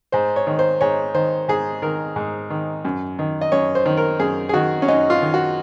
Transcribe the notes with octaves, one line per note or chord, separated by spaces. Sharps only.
G#2 C5
C#5
D#3
C5
G#2 C#5
D#3 C5
G#2 G#4
D#3 A#4
G#2
D#3
F#2
D#3
D#5
F#2 C#5
C5
D#3
A#4
F#2 G#4
G#4
D#3 F#4
C#4
F#2 D#4
F4
D#3
F#4